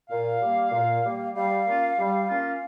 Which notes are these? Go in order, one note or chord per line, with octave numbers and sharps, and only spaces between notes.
A#2 F5
G3 A#3
A#2
G3 A#3
G3 F5
A#3 C#4 F4
G3
A#3 C#4 F4